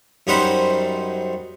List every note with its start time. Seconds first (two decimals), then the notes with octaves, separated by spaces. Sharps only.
0.27 F#2 G3 D#4 C5 F#5 B5